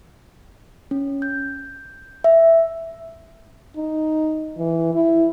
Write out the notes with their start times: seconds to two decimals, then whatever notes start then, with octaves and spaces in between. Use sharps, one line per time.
0.91 C#4
1.22 G6
2.24 E5
3.77 D#4
4.58 E3
4.94 E4